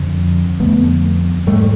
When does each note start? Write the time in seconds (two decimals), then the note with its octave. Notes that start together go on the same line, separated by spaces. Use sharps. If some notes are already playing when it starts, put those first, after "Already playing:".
Already playing: F2 D3
0.60 F2 D3 A3 B3
1.47 G#2 G3 A3